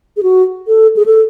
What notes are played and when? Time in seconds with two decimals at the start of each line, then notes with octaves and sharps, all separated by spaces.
0.17 G#4
0.23 F#4
0.67 A4
0.96 G#4
1.06 A4